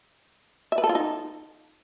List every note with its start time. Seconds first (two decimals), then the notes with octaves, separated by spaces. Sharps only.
0.72 E5
0.78 B4
0.84 A4
0.89 F4
0.95 D#4